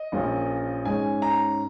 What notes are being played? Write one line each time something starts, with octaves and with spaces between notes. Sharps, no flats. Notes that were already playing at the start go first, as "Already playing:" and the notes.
Already playing: D#5
A#1 A#2 F3 C#4
G#2 G#3 C#4 G#5
A#5